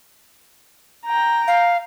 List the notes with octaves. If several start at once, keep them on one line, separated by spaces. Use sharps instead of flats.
G5 A#5
F5